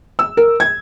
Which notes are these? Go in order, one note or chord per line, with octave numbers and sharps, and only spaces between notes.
E6
A#4
G#6